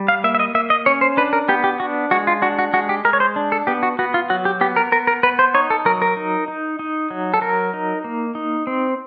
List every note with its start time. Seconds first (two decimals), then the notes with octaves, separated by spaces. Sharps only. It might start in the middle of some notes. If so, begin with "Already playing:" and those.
Already playing: G3
0.08 F5
0.24 A#3 E5
0.35 E5
0.39 D#5
0.55 A#3 E5
0.70 D#5
0.86 C#4 C#5
1.01 C5
1.17 D4 B4
1.33 A#4
1.48 B3 G4
1.64 G4
1.80 D4 F#4
2.11 G#3 F#4
2.27 F4
2.42 D4 F#4
2.59 F#4
2.73 G#3 F#4
2.89 G4
3.05 G#3 A#4
3.13 C#5
3.20 C5
3.36 D4
3.52 A4
3.67 B3 G4
3.83 F#4
3.99 B3 F#4
4.14 F4
4.30 F#3 F#4
4.45 G4
4.61 B3 G4
4.76 A#4
4.92 B3 A#4
5.07 A#4
5.23 B3 B4
5.39 C5
5.54 D#4 C#5
5.70 A4
5.85 F#3 A#4
6.02 A#4
6.17 D#4
6.48 D#4
6.79 D#4
7.10 F#3
7.34 A4
7.41 F#3 A#4
7.73 D#4
8.04 A#3
8.35 D#4
8.67 C4